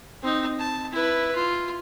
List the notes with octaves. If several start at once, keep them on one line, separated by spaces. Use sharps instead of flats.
C4 D#4
A5
E4 B4
F4